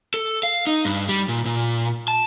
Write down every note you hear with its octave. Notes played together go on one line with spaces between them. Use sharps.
A4
F5
D#4
G2
G3
A#2
A#2
A5